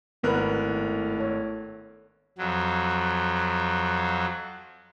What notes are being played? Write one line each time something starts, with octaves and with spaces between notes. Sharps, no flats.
G#1 A2 B3 A#4 B4 F#6
A4 C#5
F2 F#3